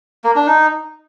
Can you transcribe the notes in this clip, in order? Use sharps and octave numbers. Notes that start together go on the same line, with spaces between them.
A#3
D4
D#4